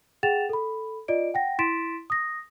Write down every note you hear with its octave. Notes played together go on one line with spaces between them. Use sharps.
G#4 F#5 G5 A6 E7 F7
A4 B5
F4 D5 D#5 D7
F#5 G5 A#6
E4 C6 A6 B6 D7 E7
D#6 A#6